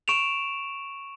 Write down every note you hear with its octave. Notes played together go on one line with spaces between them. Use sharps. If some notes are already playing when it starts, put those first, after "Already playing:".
C#6 D7 E7 F7